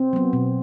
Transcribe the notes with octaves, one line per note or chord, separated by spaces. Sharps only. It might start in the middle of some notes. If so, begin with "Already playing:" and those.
Already playing: C4
F#3 B3
B2